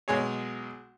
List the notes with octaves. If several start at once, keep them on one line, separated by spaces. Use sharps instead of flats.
B1 G#3 G#4 C#5